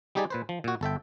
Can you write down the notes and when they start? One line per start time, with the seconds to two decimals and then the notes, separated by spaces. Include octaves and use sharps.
0.15 G3 D#4 G4 G#4 D5
0.30 A#2 B4 C5
0.49 F3
0.64 A#2 F#4
0.81 G1 A4 E5 G5